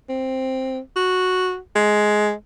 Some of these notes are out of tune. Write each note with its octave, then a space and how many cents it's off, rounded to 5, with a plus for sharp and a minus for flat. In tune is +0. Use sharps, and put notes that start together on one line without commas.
C4 +5
F#4 -5
G#3 +15